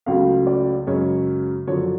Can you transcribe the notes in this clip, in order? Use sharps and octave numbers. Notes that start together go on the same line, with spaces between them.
C#2 C#3 F#3 A3 F5
D5
F#2 C#3 G#3 C#5
F#2 D3 F3 C#5